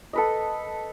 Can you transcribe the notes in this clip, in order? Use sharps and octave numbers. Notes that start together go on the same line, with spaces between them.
A4 B4 D#5